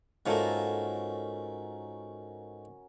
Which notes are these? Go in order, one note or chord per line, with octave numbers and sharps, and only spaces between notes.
G#2 A3 A#3 C#4 F4 F#4 A4 A#4